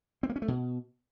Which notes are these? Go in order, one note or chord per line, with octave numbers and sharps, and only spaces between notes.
C4
A#3
C#4
A3
B2